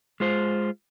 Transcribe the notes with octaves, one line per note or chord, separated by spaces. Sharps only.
G#3 F4 C5